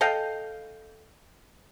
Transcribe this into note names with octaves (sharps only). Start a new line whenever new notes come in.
A4 D#5 F5 G5